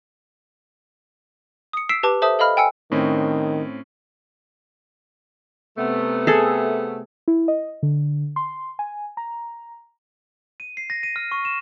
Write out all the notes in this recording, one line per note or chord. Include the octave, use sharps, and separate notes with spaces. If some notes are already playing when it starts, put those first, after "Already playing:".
D#6 C#7
E6 B6 C7 D7 E7
G4 B4 A5 D6
A4 C5 E5 A5 D#6
A4 D#5 F5 B5 F6
G5 G#5 E6 C#7
A2 D#3 C4 C#4
C3 A3 B3
G#4 A4
E4
D#5
D3
C6
G#5
A#5
D#7
C7
A#6
D#7
F6
C#6
E7